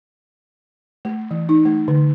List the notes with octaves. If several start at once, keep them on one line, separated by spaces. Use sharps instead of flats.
A3
E3
D#4
A3
D3